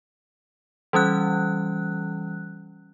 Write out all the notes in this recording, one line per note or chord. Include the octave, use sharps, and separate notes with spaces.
E3 G3 C#4 F#6